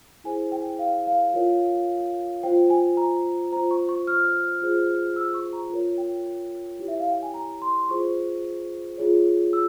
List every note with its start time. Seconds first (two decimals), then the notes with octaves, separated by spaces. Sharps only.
0.24 E4 G#4 C5 G#5
0.52 G5
0.79 F5
1.07 F5
1.34 F4 A#4 C#5
2.43 F4 C5 G5
2.70 G#5
2.97 A#5
3.52 F4 C5 A#5
3.71 C#6
3.89 C#6
4.07 F6
4.62 F4 G#4 C5
5.16 E6
5.34 C#6
5.53 A#5
5.70 F4 A#4 C#5
5.98 G5
6.79 E4 G4 C#5
6.88 E5
7.00 F5
7.11 G5
7.23 G#5
7.34 A#5
7.62 C6
7.89 F4 G#4 C5 C#6
8.98 F4 G#4 C#5
9.53 E6